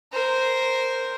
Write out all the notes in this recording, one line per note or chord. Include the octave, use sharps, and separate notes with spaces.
A#4 C5